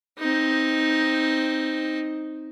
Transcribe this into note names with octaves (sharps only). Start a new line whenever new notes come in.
C4 D#4